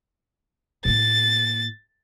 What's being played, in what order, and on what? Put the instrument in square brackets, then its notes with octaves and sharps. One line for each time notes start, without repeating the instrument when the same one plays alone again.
[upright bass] A2 A#3 [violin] A6